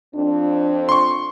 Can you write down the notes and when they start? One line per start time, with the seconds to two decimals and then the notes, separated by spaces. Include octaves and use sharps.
0.15 F2 C4 D4
0.89 C6 C#6